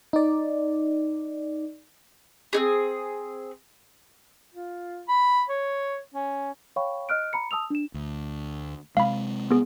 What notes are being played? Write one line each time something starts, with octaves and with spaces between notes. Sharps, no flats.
D#4 D5
C4 D#4 G#4
F4
B5
C#5
C#4
C#5 F5 G5 B5 C#6
D#5 F6 F#6 D7
A#5 B5 C#7
A5 D#6 E6 F7
D4 E7
D2
C3 G#3 F5 B5
B3 G#4